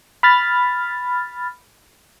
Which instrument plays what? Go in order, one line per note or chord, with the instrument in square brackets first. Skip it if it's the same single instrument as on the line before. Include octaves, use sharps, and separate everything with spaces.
[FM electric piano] B5 F6 A6